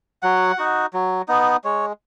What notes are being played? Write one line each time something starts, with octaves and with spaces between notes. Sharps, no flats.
F#3 F#5
D#4 F#4
F#3
B3 D#4
G#3 C#5